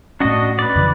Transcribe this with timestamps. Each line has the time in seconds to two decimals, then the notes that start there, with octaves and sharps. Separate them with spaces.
0.20 A2 A3 C#4 D4 F#4 D#5
0.59 B4 D5
0.75 F2 C#3 E3